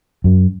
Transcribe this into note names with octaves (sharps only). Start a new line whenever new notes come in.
F#2